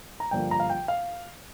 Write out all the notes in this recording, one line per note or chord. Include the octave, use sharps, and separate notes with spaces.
A#5
G2 D3 F3 A#3 G5
A#5
F5
G5
F5